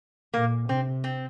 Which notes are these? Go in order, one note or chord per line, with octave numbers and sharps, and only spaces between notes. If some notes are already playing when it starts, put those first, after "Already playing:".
A#2 A#3
C3 C4
C4